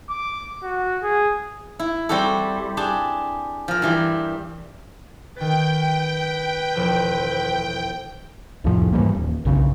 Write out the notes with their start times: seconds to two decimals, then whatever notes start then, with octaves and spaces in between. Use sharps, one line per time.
0.10 D6
0.63 F#4
1.03 G#4
1.79 E4
2.09 G3 C4 F#4 G4 A4
2.77 D4 G4 G#4 A5
3.68 F3 A#4
3.82 G2 E3 G4
5.36 D#3 B4 G5 A6
6.75 E1 F3 A4 C5
8.64 C2 F2 A2 F3
8.92 G#2 E3 G3 A#3
9.15 D#1
9.45 B1 F#2 C#3